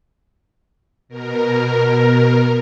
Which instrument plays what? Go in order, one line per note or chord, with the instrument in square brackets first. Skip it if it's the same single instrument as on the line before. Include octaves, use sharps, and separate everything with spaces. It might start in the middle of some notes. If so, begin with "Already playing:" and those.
[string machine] B2 A#4